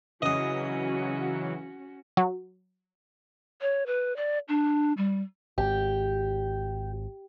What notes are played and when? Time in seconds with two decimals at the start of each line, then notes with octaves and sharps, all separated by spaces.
0.22 C#3 E3 F#3 C#4 F#4 D#5 D#6
2.17 F#3
3.61 C#5
3.86 B4
4.16 D5
4.48 D4
4.97 G3
5.58 G#1 G4